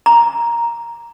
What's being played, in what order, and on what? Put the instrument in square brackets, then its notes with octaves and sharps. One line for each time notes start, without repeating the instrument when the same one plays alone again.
[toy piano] A#5